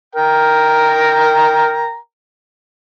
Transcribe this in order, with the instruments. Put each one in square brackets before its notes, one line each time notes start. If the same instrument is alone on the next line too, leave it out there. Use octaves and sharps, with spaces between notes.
[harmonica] A#4 G5 A#5